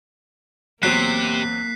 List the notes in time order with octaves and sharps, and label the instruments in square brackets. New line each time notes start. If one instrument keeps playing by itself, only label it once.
[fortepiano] E2 F#3 C4 [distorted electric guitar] C3 [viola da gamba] A#3 [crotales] F#6 B6 C7